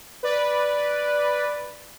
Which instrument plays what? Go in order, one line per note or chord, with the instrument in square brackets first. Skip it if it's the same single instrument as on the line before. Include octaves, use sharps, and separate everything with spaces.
[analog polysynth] B4 D5